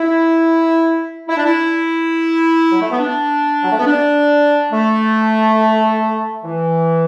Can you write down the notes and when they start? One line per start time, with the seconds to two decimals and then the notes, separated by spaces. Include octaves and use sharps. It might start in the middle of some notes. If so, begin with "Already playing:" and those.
Already playing: E4
1.28 E4
1.37 D4
1.44 E4
2.71 F#3
2.81 A3
2.91 B3
2.99 D4
3.62 F#3
3.71 A3
3.78 B3
3.86 D4
4.72 A3
6.44 E3